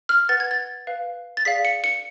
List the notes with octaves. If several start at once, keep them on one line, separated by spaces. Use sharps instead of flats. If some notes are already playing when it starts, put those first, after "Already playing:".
F6
B4 F#5 A6
G#6
A6
B4 F5
A6
G#4 D5 F5 B6
C#7
C#7